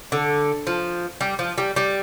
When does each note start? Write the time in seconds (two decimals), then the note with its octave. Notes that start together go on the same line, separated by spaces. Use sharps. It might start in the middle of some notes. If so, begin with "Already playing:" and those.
0.12 D3
0.67 F3
1.21 G3
1.39 F3
1.58 G3
1.76 G3